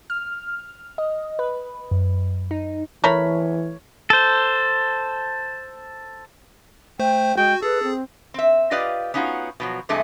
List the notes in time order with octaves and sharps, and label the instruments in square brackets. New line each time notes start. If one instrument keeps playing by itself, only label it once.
[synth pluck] F6
D#5
B4
F#2
D#4
[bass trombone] E3 [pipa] A3 A#4 B5 [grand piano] C#5
[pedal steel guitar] A4 C5
[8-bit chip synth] A3 C5 [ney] G5
[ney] G#3 [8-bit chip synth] F#4 [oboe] G5
[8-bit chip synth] G#4 [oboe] A4 [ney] B4
[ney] C4
[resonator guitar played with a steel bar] C4 E5
F4 G4 B4 D5 D#5 F5
B3 C#4 D#4 F4 F#4
B2 F3 F#3
G2 C3 E3 G#3 A3 G#4